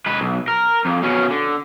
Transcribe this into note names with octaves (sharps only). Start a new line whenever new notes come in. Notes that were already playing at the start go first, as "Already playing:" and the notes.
G#3 B4
B1
A#4
F2
B2 C#4
D3